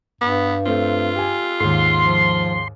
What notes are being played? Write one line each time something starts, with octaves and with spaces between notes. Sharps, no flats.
G2 B3
A3 C4 F4
G4 G#5
D#2 G#2 C6
F3